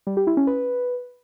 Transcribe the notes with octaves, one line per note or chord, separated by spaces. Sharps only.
G3
G4
E4
C#4
B4